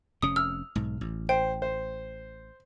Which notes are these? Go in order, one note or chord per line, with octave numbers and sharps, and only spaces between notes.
F1 C3 C#4 D#6
E6 F6
B1 G#2
A1
C5 G5
C5